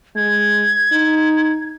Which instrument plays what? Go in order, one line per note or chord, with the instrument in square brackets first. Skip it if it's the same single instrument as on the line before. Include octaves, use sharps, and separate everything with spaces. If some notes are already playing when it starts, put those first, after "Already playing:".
[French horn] G#3 [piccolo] G#6
[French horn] D#4